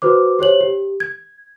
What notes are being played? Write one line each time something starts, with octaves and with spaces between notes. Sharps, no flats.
F#4 B4 C5 D6
G4 C5 C#5 F#7
G4
G#6